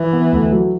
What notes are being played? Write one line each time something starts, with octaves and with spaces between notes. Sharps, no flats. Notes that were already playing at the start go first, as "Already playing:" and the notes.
Already playing: E3
B3
D2
F#3